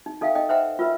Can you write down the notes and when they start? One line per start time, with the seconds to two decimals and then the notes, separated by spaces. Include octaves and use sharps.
0.06 D#4
0.21 D#4 A4 E5 F5 G5
0.35 D#4 A4 D#5 G5
0.49 B4 C5 E5 F#5 G5 A#5
0.79 F4 A#4 B4 E5